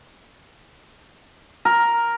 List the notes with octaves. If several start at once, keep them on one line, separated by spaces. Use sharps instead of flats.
A#4